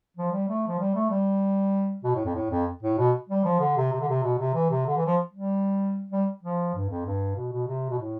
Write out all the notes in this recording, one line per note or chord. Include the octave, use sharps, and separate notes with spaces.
F3
G3
A3
F3
G3
A3
G3
B2
A2
F2
A2
F2
A2
B2
G3
F3
D3
C3
C3
D3
C3
B2
C3
E3
C3
D3
E3
F3
G3
G3
F3
G2
F2
G2
B2
B2
C3
B2
A2